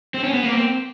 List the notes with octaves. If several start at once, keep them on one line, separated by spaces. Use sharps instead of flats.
C4
C#4
B3
A#3
C4